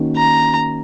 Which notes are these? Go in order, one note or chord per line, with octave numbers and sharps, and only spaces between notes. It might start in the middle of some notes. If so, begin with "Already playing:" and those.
Already playing: D#3 A#3 C#4 F#4
A#5